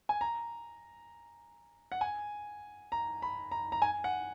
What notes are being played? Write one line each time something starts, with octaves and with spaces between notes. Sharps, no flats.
G#5
A#5
F#5
G#5
A#5
B5
A#5
A#5
G#5
F#5